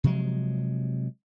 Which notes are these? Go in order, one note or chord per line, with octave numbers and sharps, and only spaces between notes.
C3 F3 F#3 G#3